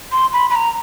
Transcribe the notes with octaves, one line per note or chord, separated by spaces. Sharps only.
C6
B5
B5
A#5